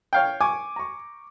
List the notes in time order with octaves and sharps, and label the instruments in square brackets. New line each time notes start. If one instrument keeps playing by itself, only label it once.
[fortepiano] C#5 F5 G5
[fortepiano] G#5 [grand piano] C#6 D6
[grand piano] A#5 C#6